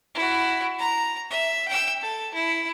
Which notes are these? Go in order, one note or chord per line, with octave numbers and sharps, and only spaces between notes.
E4 F#4
A#5
E5
G5 E6
A4
E4